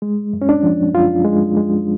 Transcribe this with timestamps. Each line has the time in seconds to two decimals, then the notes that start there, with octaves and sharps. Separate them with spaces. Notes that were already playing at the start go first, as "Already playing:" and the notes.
0.02 G#3
0.33 F#2
0.42 C#4
0.49 D4
0.63 F3
0.94 F#2 F4
1.25 G#3
1.57 G#3